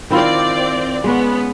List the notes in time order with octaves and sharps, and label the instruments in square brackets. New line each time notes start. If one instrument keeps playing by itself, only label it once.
[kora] D#3 E4 F4 [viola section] C4 D5
[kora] G#3 C#4 [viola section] B3